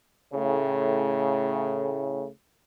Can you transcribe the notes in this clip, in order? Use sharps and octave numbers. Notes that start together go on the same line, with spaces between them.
A2 C#3